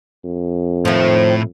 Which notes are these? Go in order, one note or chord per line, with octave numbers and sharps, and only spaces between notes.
F2
A2 D#3 F3 E5